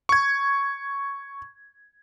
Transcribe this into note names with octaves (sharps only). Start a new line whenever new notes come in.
C#6 G#6